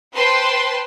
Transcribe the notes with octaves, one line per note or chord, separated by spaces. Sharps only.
B4 C5 G5 A5 C6